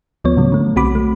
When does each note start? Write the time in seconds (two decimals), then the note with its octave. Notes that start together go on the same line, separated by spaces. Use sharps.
0.24 D2 F3 B3 C#5
0.37 A2 C#3 F#3
0.52 D3 A3
0.76 B1 C4 F#4 B5 D6
0.95 A3